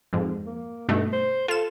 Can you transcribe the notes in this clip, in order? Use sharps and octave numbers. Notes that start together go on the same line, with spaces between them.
F2 G#2
A#3
G2 B2 A3 D#4
C5
F4 A4 E7